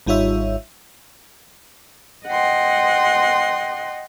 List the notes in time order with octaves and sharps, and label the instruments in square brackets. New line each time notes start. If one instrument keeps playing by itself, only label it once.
[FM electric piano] G#1 G3 D#4 F4 C#5 E5
[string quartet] D#5 F#5 G5 C6